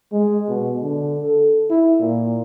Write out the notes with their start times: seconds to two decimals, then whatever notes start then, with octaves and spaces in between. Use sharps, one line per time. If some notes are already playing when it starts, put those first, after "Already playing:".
0.12 G#3
0.49 B2
0.82 D3
1.21 A4
1.70 E4
2.00 A#2